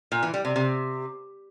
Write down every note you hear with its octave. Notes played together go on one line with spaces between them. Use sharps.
A#2
E3
G3
C3
C3